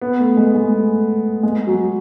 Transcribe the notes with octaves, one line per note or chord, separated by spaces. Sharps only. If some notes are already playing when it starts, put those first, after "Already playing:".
B3
A3
G#3
G#3
A3
G#3
F#3